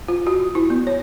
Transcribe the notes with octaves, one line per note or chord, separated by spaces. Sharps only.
F4
F#4
E4
B3
C#5